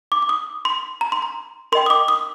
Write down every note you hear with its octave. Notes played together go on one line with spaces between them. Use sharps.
D6
D6
D#6
C6
A#5
C6
A#5
A#4 D#5 G5 C6
D#6
D6
D#6